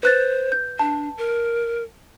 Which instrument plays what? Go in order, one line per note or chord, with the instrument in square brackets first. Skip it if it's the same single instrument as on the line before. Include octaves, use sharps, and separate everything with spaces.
[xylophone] B4 F#6 A6 [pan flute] C5
[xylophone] G6
[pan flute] D4 [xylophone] A5
[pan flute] A#4